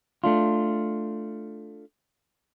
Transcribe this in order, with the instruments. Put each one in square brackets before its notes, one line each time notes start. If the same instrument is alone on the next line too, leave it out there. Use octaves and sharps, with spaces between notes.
[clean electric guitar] A3 D4 F4